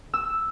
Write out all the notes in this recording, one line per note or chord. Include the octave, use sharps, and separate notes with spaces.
E6